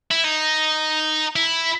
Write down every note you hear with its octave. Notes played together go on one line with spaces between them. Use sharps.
E4
D#4
E4